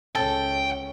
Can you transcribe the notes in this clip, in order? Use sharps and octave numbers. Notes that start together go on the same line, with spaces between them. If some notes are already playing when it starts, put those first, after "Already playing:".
C#2 C#4 A4 G5